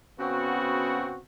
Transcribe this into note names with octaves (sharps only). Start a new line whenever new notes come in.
C#3 B3 C4 F#4